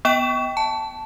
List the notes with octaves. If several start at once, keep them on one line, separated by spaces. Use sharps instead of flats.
B3 G5 E7
A5